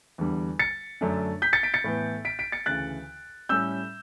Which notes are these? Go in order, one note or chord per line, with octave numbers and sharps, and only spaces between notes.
E2 D3 G3
A6 C#7
F#2 D3 A3 D4
G6 B6
A6 C#7
B6 D7
A6 C#7
A2 E3 B3
B6 D7
B6 D7
A6 C#7
D2 C#3 E3 F#6 A6
A2 G3 C#4 E6 G6